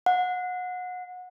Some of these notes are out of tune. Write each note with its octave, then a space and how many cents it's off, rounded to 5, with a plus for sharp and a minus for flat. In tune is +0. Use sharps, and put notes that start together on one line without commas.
F#5 -25